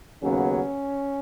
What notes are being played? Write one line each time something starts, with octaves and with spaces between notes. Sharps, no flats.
D#2 C#3 F#3 B3 C#4